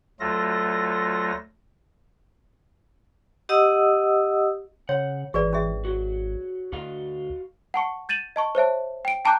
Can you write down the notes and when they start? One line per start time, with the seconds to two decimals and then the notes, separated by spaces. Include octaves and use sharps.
0.20 D2 F#3 A3 F4 A4 A#6
3.49 G4 D#5 F#5 D#6 E6
4.89 C#3 C#5 F#5
5.34 G#1 E3 G#4 B4 D5
5.53 C#4 G#4 E5
5.85 F#4 C#5
6.72 D2 F#4 D#5 F5
7.74 F#5 A5 C#6 C#7
8.09 G6 A6 D#7 E7 F#7
8.36 D#5 A5 C#6
8.55 C5 C#5 E5 A5
9.05 G5 D7
9.25 G5 A5 A#5 D6 F#6 G6